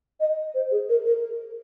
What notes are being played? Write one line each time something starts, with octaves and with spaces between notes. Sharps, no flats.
D#5
C5
G#4
A#4
A#4